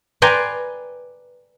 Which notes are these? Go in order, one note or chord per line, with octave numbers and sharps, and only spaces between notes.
B4 D5 G5 G#5 A#5 C6